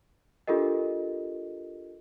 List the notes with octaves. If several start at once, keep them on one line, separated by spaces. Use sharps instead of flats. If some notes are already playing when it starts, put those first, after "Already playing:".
D4 F4 G4 A4 A#4 D#5